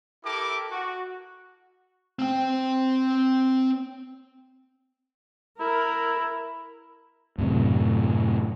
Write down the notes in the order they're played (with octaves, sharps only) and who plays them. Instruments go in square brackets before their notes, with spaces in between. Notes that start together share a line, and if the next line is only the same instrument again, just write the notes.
[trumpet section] E4 G4 A4 A#4 D6
F#4
[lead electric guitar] C4 G5
[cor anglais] E4 [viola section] A#4
[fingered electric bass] F#2 A2 C3